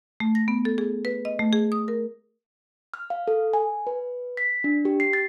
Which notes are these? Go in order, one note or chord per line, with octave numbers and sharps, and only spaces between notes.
A3
A#6
B3
A4
G#4
B4
D#5
A3
G#4
D#6
A#4
F6
F5
A4
G#5
B4
B6
D4
G4
C7
A6